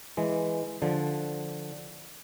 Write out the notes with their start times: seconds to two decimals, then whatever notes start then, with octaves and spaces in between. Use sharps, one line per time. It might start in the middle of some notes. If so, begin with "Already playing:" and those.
0.17 E3 G#3
0.82 D3 F3